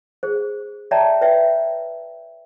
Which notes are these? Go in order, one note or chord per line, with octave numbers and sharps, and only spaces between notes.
G#4 C5
C#5 D5 E5 G5 A5 A#5
B4 C#5 D5 E5 G5